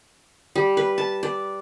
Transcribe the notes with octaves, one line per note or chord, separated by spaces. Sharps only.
G3
B4
A5
D5